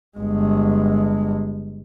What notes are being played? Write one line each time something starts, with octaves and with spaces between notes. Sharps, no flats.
G1 G#3